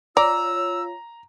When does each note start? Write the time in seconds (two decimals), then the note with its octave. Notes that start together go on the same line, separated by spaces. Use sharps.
0.17 F4 C#5 D5 A#5 E6